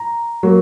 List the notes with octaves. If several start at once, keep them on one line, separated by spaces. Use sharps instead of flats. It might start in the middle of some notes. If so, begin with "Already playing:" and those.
Already playing: A#5
F#3 A#3